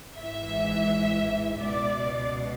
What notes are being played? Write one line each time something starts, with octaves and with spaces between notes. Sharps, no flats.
G#1 G#2 E3 E5
C#2 B2 D5